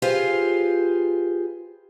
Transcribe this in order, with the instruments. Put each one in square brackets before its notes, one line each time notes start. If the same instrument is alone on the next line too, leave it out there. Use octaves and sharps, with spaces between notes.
[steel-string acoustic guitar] F4 G4 G#4 B4 C5 F5